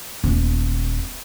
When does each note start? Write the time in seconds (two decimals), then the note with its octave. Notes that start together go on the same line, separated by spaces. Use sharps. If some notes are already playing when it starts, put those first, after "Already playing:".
0.24 D#1 B3